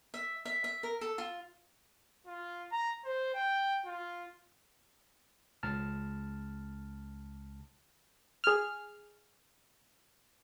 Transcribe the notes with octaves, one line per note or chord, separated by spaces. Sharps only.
E5
E5
E5
A#4
A4
F4
F4
A#5
C5
G5
F4
C#2 A5 F6
G#4 F6